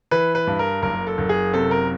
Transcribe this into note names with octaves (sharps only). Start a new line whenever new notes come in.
E3 B4
B4
G2
A#4
F#1 A#4
A4
F#1
G#4
C3 A4
A#4